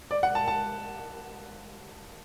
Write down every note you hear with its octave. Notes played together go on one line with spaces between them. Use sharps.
D5
F#5
A5
A5